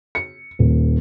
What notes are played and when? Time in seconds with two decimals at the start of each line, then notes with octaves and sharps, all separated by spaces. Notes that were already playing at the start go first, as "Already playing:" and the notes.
0.15 C#7
0.59 D#1